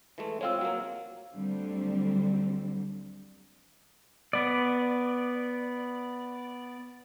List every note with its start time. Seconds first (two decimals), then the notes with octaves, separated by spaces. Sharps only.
0.18 E3 G#3 A3
0.41 G#3 C4 F4 C#5 F5 E6
0.61 F#3 A#3
1.35 D2 D3 F#3 G3 C4
4.33 B3 D5